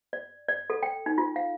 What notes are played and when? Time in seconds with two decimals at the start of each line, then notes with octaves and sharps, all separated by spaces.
0.13 D5
0.48 D5
0.70 A4
0.83 G5
1.06 D#4
1.18 F4
1.36 F5